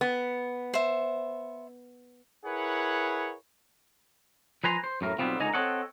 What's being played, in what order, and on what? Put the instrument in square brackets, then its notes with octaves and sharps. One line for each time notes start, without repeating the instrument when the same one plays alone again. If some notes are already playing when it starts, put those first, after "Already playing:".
[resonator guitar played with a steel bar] B3
[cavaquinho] C5 E5
[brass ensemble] E4 G#4 A#4 B4 C#5 F#5
[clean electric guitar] F3 B4 G#5 A#5 C6
C5
F#2 A2 A#4
B1 B2 G3 B3 C4 F4
C#2 D3 D#4 G#5 A#5
C4 A4 C#5 D#5 F#5